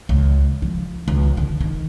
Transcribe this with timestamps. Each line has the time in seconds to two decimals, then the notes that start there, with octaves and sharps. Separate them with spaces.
0.09 C#2
0.62 F3
1.08 C#2
1.37 D3
1.60 D#3